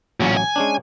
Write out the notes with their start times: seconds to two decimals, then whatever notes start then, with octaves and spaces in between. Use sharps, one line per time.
0.20 A1 A#2 F#3 C#4
0.37 G#5
0.56 G#3 C#4 D4